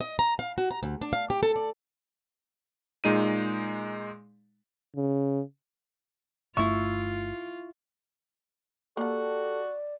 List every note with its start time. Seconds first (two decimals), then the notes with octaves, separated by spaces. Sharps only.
0.01 D#5
0.19 A#5
0.39 F5
0.58 F#4
0.71 A#5
0.83 D2
1.02 D4
1.13 F5
1.30 G4
1.43 A4
1.56 D5
3.04 A#2 G#3 D#4 D#7
4.96 C#3
6.57 G1 G2 A3 E4 F4 E5 C#6
8.97 A#3 F#4 G4 A4 D5 F#5